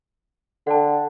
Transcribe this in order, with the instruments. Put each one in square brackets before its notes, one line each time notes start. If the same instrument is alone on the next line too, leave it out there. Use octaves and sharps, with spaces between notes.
[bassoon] D3 [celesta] F#5 G5 A5